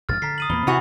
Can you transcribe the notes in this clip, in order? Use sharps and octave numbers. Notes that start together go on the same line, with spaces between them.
A#1 G#2 F6 A6
D3 A#5 B6 C7
D#6 D#7 F#7
E2 A#2 A#3 B5 G7
C3 E3 F#4 F7